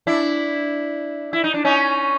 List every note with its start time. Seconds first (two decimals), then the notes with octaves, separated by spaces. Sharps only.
0.07 D4 E4
1.33 E4
1.44 D#4
1.54 D4
1.65 C#4 D#4